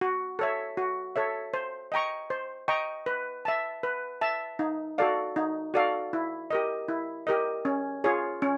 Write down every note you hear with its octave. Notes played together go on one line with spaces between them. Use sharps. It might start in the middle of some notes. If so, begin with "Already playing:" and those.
F#4
A4 C#5 E5
F#4
A4 C#5 E5
C5
D#5 G5 A#5 C#6
C5
D#5 G5 A#5 C#6
B4
E5 A5
B4
E5 A5
D#4
F#4 A4 D5 F5
D#4
F#4 A4 D5 F5
E4
G4 A#4 D#5
E4
G4 A#4 D#5
C#4
F4 G#4 C#5
C#4